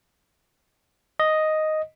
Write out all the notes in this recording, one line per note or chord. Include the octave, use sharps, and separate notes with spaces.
D#5